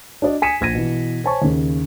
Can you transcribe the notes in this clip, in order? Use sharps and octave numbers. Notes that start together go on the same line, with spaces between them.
D4 F#4 D5 D#5
G#5 D#6 B6 C#7 D#7 E7
A#1 G#6 A#6 D#7
B2 E3
C5 C#5 G#5 A5 C#6
D#2 C#3